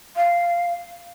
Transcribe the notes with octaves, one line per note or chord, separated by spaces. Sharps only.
F5